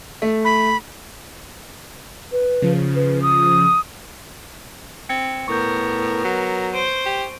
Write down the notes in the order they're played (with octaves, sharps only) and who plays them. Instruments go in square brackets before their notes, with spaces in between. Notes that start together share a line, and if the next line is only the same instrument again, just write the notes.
[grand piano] A3
[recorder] B5
[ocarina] B4
[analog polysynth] C#3 F3
[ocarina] B4
D#6
[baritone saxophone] C4 [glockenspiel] G#6 C#7
[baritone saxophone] A2 [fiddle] B3 A#4 [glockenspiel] C#6 G6
[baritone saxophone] F#3
[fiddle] C5 [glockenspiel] D7 D#7
[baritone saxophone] G4